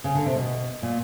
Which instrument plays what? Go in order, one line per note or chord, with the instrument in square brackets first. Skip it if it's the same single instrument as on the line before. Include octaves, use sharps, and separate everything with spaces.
[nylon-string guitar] C#3
D3
C3
B2
A#2